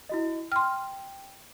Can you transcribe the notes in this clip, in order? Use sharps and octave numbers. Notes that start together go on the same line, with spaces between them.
E4 F#4 D#5
G5 C6 F6